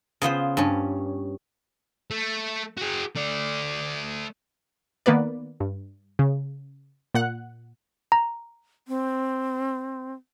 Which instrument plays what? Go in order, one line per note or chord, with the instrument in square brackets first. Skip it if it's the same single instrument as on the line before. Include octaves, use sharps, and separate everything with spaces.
[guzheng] C#3 B3 F4 C5
G2 C#4
[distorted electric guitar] A3
F#4 G#4
A3 D5
[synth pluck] D#3 A#3 B3 B4 D5
G2
C#3
A#2 F#5 F#6
[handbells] A#5
[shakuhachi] C4